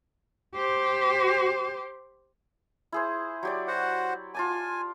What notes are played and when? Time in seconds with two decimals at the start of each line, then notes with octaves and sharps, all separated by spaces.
0.56 G4 C5
2.92 E4 G#4 C5
3.43 F#3 G4 D5
3.68 F#4 C5 F#5
4.34 F4 G#5 A5 D6